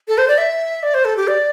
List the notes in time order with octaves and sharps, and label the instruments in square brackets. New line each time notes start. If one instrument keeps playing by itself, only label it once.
[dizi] A4
C5
D5
E5
D5
C5
A4
G4
D5